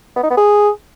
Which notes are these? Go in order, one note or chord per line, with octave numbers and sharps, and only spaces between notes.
B3
D#4
B3
G#4